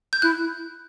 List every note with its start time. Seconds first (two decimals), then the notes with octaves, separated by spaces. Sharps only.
0.13 G6
0.22 E4 F#6